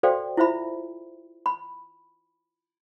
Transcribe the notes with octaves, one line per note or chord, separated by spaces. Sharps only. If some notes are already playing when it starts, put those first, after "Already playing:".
F#4 A4 C5 D5 F5 G5
E4 F4 C5 E5 B5
B5